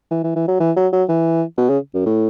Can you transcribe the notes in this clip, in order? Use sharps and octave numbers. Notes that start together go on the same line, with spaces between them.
E3
E3
E3
F#3
E3
F#3
F#3
E3
B2
C#3
F#2
A2